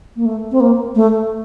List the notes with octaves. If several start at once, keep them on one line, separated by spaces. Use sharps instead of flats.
A#3
A3
C4
A#3
A3